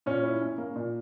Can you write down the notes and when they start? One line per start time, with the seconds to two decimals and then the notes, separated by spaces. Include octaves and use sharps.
0.06 A#2 C#4
0.24 E4
0.41 C#4
0.58 A#3
0.76 A#2